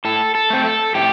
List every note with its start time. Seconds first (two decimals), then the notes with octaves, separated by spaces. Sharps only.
0.05 A2 A4
0.35 A4
0.50 A3 C4
0.65 A4
0.95 A2 G4